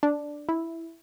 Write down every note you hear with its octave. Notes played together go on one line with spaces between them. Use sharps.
D4
E4